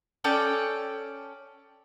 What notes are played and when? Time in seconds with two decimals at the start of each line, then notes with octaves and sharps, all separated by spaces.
0.24 C#4 A4 D5 G5